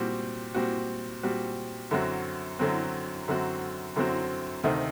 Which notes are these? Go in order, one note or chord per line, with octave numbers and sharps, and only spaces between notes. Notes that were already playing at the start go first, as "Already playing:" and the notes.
Already playing: A#2 G3 C4 F#4
A#2 G3 C4 F#4
A#2 G3 C4 F#4
F#2 D3 F#3 C4 F#4
F#2 D3 F#3 C4 F#4
F#2 D3 F#3 C4 F#4
F#2 D3 F#3 C4 F#4
D2 C3 D#3 A3 D#4